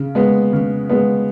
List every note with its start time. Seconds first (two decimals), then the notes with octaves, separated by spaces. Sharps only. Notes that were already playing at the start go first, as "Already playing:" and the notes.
Already playing: C#3
0.15 G#3 B3
0.53 C#3
0.90 G#3 B3